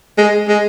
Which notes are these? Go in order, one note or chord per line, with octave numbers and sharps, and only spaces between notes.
G#3
G#3